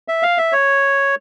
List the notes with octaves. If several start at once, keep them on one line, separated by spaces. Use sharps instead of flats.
E5
F5
E5
C#5